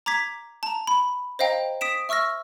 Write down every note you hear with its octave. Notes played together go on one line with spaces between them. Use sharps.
A#5 D6 G#6 B6
A5 A#5
B5
C5 D#5 F5 G5 A#5
D#6 B6 D7 E7
E5 C#6 E6 F6 A#6